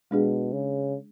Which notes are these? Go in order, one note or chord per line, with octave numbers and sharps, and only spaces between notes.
B2 G#3 D4 G#4
C#3